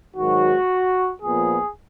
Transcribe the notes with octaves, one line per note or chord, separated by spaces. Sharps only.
G#2 D#3 F#3 F#4
A#2 F3 B3 G#4